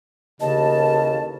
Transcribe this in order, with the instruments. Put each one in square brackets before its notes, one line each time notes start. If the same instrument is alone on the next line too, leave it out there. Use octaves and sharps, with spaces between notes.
[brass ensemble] A1 D#2 [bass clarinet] C#3 [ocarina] D#5 [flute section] A5